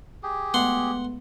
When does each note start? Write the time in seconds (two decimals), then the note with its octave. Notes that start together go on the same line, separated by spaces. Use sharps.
0.23 G4 G#4
0.54 G#3 A3 B3 F#5 C6